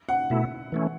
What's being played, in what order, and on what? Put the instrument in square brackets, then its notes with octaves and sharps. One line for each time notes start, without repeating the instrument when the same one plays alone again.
[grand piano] F#5
[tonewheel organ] B2 A3 E4
E3 A3 C#4